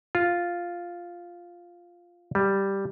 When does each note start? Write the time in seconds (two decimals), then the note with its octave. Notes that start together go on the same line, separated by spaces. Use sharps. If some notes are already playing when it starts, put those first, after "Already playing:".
0.15 F4
2.35 G3